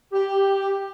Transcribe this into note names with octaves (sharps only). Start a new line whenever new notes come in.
G4